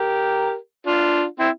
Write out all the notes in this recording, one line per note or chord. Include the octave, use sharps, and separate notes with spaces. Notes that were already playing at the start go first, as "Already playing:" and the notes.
Already playing: G4 A#4
D4 F4
C4 E4